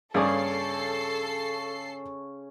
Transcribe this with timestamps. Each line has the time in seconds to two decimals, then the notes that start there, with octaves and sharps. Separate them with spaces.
0.14 G2 C#3 C#4 G#4 A4 D5 C7